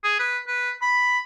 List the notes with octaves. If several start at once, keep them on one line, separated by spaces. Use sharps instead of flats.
G#4
B4
B4
B5